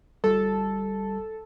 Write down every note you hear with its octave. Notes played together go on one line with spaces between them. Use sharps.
G1 G3 A4